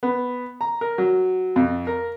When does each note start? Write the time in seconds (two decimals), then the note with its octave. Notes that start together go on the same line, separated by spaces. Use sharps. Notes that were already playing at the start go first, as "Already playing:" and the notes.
0.03 B3
0.61 A#5
0.81 A#4
0.98 F#3
1.56 F2
1.87 A#4